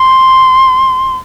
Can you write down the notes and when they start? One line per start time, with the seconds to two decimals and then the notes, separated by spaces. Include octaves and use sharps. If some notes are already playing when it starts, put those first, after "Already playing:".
Already playing: C6